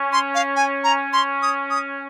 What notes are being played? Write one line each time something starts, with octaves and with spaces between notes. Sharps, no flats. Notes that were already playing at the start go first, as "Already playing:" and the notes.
Already playing: C#4
C6
F5
G#5
A#5
C6
D#6
D#6